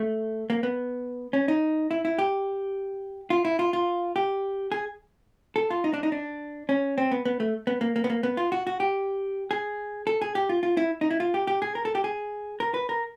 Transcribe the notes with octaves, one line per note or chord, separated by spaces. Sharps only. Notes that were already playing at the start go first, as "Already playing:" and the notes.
Already playing: A3
A#3
B3
C#4
D#4
E4
E4
G4
F4
E4
F4
F4
G4
G#4
A4
F4
D#4
D4
D#4
D4
C#4
C4
B3
B3
A3
B3
A#3
A#3
B3
A#3
B3
F4
F#4
F#4
G4
G#4
A4
G#4
G4
F4
F4
E4
D#4
E4
F4
G4
G4
G#4
A#4
A4
G4
G#4
A#4
B4
A#4